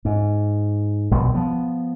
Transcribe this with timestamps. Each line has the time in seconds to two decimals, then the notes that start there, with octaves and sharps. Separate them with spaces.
0.05 G#2
1.11 A#1 B2 F#3 G3
1.35 F3 B3